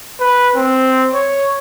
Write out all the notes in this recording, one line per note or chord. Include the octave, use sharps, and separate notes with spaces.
B4
C4
C#5